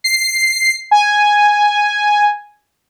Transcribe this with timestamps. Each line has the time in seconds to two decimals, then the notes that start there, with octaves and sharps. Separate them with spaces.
0.04 C7
0.91 G#5